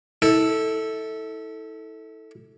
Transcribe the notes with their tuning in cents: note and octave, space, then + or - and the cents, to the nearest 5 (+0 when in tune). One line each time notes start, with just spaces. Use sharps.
E4 -35 A4 +0